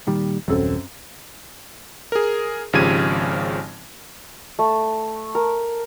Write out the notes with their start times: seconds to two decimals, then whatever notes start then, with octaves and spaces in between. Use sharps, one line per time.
0.07 A#2 D#3 G3
0.48 D#1 F#2 C4 A4
2.12 G#4 A#4
2.73 G#1 C#3 F3 G4 G#6 D#7
4.59 A3
5.35 A#4